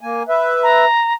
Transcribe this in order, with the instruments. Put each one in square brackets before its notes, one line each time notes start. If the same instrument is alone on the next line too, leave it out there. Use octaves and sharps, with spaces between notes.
[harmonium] A#3 G#5
B4 E5
[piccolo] A#5